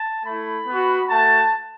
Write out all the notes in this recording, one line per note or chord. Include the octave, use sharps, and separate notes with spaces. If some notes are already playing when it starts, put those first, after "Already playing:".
Already playing: A5
A3 E4 B5
B3 F#4
A3 F#4 A5